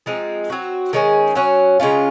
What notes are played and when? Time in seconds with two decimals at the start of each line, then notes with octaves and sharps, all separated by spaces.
0.06 F3 G#3 C4 D#4
0.50 F#3 C4 F#4
0.93 D#3 G#3 C#4 G#4
1.35 F#3 C#4 F#4
1.80 C#3 G#3 C#4 F4